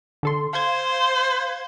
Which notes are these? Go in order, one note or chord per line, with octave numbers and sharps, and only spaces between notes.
D3 A4 C6
C5 F5 G#6